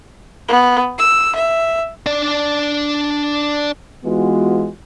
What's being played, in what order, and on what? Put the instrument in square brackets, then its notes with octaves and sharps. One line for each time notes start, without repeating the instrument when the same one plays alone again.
[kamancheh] B3
E6
E5
[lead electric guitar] D4 D5
[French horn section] E3 G#3 B3 F4 F#4